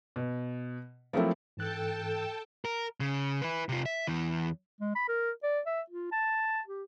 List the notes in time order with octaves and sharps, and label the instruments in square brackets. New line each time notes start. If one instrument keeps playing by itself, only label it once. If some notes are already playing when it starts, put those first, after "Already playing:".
[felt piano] B2
F3 F#3 A3 A#3 C4 E4
[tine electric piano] G#2 E3 F#6 [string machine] A4 G5 A5
[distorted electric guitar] A#4
C#3
E4 B4
C3 F4
E5
E2 E3
[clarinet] G#3
B5
A#4
D5
E5
F4
A5
G4